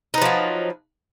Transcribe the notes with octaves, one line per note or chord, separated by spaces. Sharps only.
F3 F#3 D#4 B4